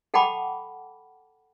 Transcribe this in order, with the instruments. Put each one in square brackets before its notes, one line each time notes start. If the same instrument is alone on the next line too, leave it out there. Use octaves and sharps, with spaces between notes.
[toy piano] A4 F#5 G5 A5 B5 D6